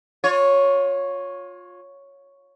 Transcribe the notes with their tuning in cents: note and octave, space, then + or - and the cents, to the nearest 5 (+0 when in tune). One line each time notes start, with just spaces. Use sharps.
F4 +30 C#5 +0